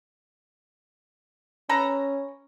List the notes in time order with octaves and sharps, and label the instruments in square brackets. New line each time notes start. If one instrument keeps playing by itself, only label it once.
[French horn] C#4 [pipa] A4 B4 A#5